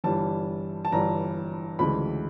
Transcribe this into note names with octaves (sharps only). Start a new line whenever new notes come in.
G1 G2 E3 G3 A5
A5
G1 G2 E3 G3 A#5
D2 C#3 E3 G#3 B5